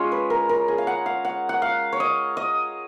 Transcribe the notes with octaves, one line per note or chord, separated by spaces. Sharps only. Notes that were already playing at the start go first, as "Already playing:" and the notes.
Already playing: G#3 C#4 F4 C#5
B4
A#4
A#4
G#4
F5
F#5
F5
F#5
F#5
F5
C#5
D#5
D#5